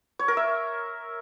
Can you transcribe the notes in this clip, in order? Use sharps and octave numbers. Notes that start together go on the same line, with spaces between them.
C#5
A#4
E5